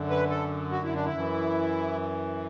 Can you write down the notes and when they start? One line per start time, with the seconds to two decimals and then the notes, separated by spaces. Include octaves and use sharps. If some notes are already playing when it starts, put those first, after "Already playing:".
Already playing: F#2 D3
0.10 B4
0.30 A4
0.71 F#4
0.83 E4
0.94 D4
1.05 E4
1.13 F#2 E3